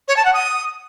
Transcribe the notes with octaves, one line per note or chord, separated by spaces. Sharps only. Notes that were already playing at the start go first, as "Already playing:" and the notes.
C#5
A5
F#5
D#6